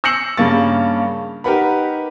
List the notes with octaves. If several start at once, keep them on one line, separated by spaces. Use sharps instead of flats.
E6 G6 A#6 C7 C#7 F#7
G2 C#3 A#3 C#6 A6
D#4 G4 A#4 B4 F#5 B5